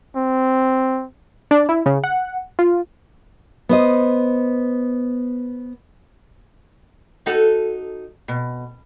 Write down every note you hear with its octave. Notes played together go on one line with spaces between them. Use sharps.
C4
D4
E4
C#3
F#5
F4
B3 C5 D#5
D#4 F#4 A4
B2